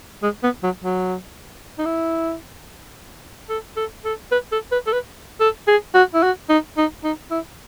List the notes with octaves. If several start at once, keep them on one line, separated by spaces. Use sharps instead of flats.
G#3
B3
F#3
F#3
D#4
E4
A4
A4
A4
B4
A4
B4
A4
B4
A4
G#4
F#4
E4
F#4
D#4
D#4
D#4
E4